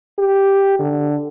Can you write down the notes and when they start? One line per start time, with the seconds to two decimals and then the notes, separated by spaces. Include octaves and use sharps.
0.19 G4
0.79 D3